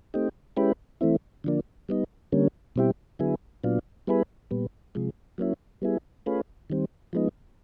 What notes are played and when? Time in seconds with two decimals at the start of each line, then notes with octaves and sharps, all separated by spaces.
0.14 A3 C4 D#4 G4
0.57 G#3 C#4 E4 G4 B4
1.01 E3 A3 C4 E4
1.44 D3 F3 A#3 D4
1.89 G3 B3 D#4
2.32 D3 G3 A#3 C#4
2.76 B2 G3 C4 E4 G4
3.19 D3 F#3 B3 E4 G#4
3.64 A#2 F#3 B3 D4 F4
4.07 G3 B3 E4 G#4 B4
4.51 A#2 G3 B3
4.95 C3 F3 G#3
5.38 F#3 A#3 C#4 E4
5.82 G3 B3 E4 G#4
6.26 A3 C#4 F4 G#4 B4
6.70 D#3 G3 C4
7.13 F3 G#3 B3 D#4